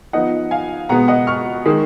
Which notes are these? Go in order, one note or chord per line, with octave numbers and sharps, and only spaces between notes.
F3 B3 D#4 D#5 F#5
F5 G#5
B2 G#3 B3 F#5 A#5
D#5 F#5
C#6 F6
D#3 G#3 D#4